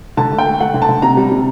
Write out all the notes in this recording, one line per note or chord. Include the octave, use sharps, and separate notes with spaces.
D3 A5
A3
G5
A3
A3 F#5
D3
A5
D3
C3 A#5
G3
C3